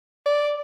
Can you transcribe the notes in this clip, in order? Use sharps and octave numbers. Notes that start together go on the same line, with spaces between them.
D5